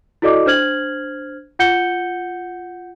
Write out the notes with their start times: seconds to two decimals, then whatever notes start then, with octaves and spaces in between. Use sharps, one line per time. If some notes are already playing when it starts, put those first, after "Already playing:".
0.22 E4 F#4 A4 D5 D#5 D6
0.46 D4 C5 F6 G#6 F#7
1.59 F4 F#5 G6 C#7 G7